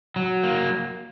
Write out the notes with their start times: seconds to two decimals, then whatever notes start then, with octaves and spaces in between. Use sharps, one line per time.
0.16 F#3
0.43 A#3